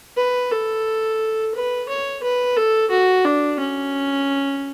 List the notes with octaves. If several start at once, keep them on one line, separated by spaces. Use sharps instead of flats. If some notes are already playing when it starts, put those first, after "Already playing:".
B4
A4
B4
C#5
B4
A4
F#4
D4
C#4